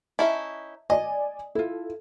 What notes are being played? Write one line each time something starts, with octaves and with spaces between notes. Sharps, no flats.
C#4 D#4 E4 E5 A5
D5 D#5 G#5
E4 F4 A4